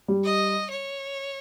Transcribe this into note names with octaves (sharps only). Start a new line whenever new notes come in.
G3
D#5
C#5